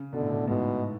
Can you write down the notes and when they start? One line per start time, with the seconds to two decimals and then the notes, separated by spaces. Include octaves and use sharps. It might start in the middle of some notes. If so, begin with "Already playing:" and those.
Already playing: C#3
0.13 B2 D3
0.22 A2
0.31 B2
0.47 G#2 B2